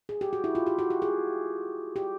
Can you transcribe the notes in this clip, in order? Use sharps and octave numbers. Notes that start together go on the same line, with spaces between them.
G#4
G4
F#4
E4
F4
G4
F#4
G4
G#4
G4